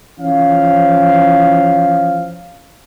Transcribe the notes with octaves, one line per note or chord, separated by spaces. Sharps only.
E3 F3 C#4 F5